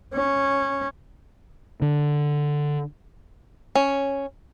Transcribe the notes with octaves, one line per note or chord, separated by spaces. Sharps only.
C#4
D3
C#4